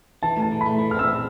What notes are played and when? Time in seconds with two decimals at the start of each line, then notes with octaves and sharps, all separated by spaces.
0.23 E3 A5
0.37 A2
0.42 A5
0.52 E3
0.61 A3 B5
0.79 E3
0.91 F6
0.94 C4
0.99 E6
1.08 C4